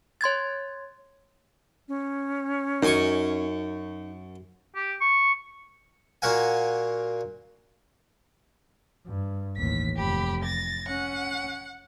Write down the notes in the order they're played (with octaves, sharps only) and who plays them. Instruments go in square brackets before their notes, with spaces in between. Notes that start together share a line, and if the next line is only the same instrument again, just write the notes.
[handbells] C#5 C6 G#6 A6
[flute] C#4
[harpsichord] F#2 G#5 C#6 [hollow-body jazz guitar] D#4
[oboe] G4
C#6
[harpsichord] A#2 F#4 A#4 F5 F#5 G#5
[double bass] G2
[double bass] A1 D#2 [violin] B6
[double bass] F1 [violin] G4 B5
[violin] A6 A#6
[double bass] C#4 [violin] F#5